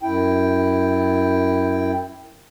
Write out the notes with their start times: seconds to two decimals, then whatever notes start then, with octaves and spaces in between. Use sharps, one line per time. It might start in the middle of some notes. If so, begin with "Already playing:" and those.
0.03 F#2 E4 G5